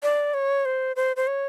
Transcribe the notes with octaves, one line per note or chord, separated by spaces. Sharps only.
D5
C#5
C5
C5
C5
C#5